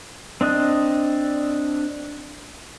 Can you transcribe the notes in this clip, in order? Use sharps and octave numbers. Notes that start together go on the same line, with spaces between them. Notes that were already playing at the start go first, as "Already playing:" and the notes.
C4 D4 D#5 F#6